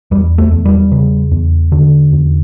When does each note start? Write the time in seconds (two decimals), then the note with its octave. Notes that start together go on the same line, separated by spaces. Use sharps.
0.11 E2 G3
0.38 A3
0.52 E2
0.65 G3
0.92 C#3
1.31 E2
1.72 D3
2.13 E2